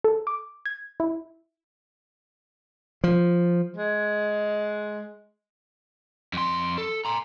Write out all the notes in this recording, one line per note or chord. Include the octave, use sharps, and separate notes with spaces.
A4
D6
G#6
E4
F3
G#3
F2 C6
A4
A#5 C6